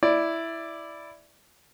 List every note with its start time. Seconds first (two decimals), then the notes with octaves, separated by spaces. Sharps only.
0.03 E4 D5